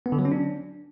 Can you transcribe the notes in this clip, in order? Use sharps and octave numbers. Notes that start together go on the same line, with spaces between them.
B3
D3
F#3
C#4
D4